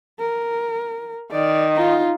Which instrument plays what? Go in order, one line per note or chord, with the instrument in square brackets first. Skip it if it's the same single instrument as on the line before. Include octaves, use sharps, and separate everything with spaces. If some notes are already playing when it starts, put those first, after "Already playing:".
[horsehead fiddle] A#4
[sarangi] D#3 [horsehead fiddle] D5
[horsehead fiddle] D#4 F4